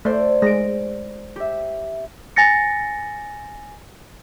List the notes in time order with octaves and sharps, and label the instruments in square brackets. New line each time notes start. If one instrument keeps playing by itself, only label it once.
[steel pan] A3 [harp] C5 D5
[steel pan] G#3 [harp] A#6 D7
[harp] G4 E5
[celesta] G#5 A6 A#6 C#7